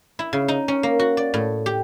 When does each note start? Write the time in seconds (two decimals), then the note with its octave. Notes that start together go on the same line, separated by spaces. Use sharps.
0.19 E4
0.33 C#3
0.48 D#4
0.68 C#4
0.83 A#3
0.99 F#4
1.17 D5
1.34 A2
1.66 G4